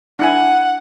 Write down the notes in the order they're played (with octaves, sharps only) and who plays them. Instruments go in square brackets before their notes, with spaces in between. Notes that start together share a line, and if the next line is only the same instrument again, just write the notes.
[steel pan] D4 E4 G#5 [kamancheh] F#5